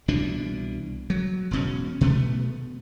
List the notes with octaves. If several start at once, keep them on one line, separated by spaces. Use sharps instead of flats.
C2 B2 E3 D4
F#3
E1 B2 C#4
B2 A3 B3